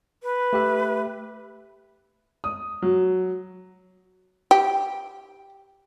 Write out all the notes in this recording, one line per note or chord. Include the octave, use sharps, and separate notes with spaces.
B4
A3 G4 E5
D#6
F#3
G4